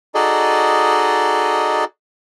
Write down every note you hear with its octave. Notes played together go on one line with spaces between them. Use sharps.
D#4 F#4 G#4 A4 D5 D#5